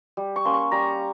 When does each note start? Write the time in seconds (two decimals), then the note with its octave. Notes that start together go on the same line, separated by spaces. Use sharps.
0.17 G3
0.36 C#6
0.45 A#3 C#4 C6
0.54 C#6
0.72 G3 A#5